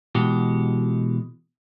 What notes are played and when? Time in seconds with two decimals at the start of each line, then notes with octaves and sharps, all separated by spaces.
0.15 B2 E3 G#3 F#4 G4